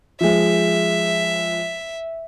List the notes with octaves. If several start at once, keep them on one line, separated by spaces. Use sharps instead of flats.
F3 G#3 E5